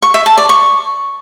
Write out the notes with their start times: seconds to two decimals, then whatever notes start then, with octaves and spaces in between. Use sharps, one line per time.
0.02 C#6
0.14 E5
0.26 A5
0.38 D5
0.49 C#6